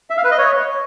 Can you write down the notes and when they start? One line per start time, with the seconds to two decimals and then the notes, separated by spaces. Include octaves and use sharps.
0.10 E5
0.17 F5
0.24 B4
0.31 D#5
0.38 C#5